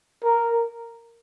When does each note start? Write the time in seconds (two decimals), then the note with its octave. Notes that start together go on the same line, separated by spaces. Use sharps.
0.24 A#4